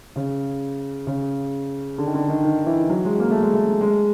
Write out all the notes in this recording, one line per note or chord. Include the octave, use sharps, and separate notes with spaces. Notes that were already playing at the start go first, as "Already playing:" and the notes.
C#3
C#3
D3
D#3
D3
D#3
D#3
E3
F#3
G#3
A#3
A3
G#3
A3
G#3